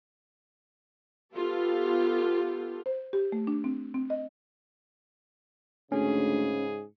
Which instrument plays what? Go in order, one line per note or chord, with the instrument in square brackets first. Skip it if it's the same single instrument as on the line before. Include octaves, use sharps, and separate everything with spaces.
[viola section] B3 F4 G4 A4
[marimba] C5
G4
A3
D4
C4
C4
D#5
[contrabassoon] D2 [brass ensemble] G#2 C#3 G#4 [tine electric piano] C#4